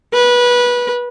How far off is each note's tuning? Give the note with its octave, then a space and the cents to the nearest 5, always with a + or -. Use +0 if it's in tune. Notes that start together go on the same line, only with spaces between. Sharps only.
B4 -20